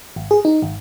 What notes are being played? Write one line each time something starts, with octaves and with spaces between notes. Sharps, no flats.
G#1
G#4
D#4
G#1